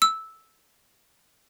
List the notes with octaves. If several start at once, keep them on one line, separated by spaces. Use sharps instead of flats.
E6